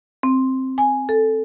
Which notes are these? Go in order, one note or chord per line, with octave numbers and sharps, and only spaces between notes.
C4
G#5
A4